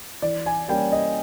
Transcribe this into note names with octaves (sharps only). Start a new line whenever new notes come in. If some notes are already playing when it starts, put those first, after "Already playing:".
E3 D5
G#5
G3 A#3 C#4 G5
D#5